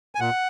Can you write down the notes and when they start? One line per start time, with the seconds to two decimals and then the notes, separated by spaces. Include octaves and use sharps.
0.15 G#5
0.20 A#2 F#5